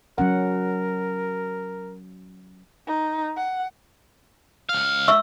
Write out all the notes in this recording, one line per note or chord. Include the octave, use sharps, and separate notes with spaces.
F#3 C#4 A#4 F#5
D#4
F#5
C#2 F5
E5 C#6 E6